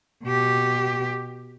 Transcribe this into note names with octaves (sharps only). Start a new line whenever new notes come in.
B2 G4